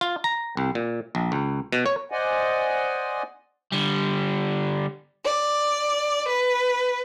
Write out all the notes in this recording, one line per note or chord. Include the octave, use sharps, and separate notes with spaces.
F4
A#5
C2
A#2
A#1
C#2
B2
C#5
C5 D5 D#5 F#5 G#5
D3 G3
D5
B4